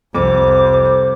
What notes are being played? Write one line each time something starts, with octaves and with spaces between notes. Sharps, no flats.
C2 F2 C5 D6